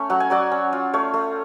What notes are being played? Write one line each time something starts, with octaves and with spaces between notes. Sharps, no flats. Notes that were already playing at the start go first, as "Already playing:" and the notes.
Already playing: A3 C#4 C#5
F#3 F#5
G#5
F#3 D5 F#5
C#4
F4
A3 C#5 F5
A3